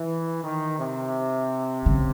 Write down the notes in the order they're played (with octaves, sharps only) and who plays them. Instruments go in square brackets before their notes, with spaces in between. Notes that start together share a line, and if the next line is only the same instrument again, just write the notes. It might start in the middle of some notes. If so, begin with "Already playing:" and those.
Already playing: [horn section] E3
D#3
C3
[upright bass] C#3